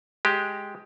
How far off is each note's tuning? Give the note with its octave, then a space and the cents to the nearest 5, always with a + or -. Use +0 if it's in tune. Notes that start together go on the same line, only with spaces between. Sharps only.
G#3 +5 G4 +0